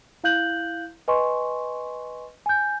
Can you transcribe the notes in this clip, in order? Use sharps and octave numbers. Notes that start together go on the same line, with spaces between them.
E4 F5 F#6 G6 F#7
B4 D#5 G#5 C6 C#6
G#5 G6